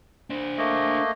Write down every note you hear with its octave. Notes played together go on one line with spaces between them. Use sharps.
D4 C5
A3 A#3 D#5